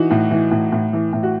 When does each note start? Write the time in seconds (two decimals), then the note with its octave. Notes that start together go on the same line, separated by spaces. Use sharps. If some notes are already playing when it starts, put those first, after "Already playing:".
Already playing: E3 D#4 F#4
0.11 A2
0.31 E3
0.51 A2
0.72 A2
0.93 E3
1.13 A2
1.23 F#4